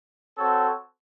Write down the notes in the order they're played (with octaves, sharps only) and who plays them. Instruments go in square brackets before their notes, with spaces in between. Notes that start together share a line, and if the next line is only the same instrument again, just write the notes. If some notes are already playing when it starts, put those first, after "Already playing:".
[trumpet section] C4 F#4 A4 C#5